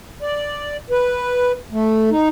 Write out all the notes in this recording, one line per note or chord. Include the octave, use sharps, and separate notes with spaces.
D5
B4
A3
D#4